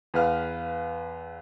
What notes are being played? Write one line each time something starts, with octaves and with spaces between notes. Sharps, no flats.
E2 B4 F5 F6